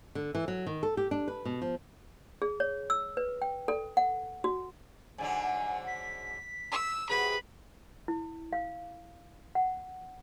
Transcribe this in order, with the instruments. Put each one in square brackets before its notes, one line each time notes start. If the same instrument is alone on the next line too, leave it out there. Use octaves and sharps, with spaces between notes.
[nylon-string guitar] D3
E3
F#3
D#3
A4
G4
D4
B4
B2
F3
[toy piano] G#4
C#5
E6
B4
G5
A4
F#5
F#4
[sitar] G#2 D3 F#3 [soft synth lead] G#5
[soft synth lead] B6
[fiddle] E6
[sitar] C3 F#4 [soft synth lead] G#4 [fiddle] B4 B5
[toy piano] E4
F5
F#5